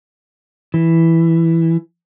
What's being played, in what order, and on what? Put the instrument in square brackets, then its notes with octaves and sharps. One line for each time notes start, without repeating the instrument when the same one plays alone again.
[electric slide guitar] E3